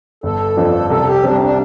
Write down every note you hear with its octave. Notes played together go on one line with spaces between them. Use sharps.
G1 A4
F2 F3 D4 F4
C2 A4
G4
C3 G3 C4 D4
D4